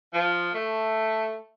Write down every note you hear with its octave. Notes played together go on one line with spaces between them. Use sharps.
F3
A3